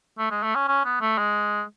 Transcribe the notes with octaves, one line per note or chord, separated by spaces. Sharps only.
A3
G#3
A3
C#4
C#4
B3
A3
G#3